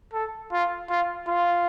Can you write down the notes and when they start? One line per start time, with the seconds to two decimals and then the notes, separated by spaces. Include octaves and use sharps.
0.13 A4
0.52 F4
0.90 F4
1.27 F4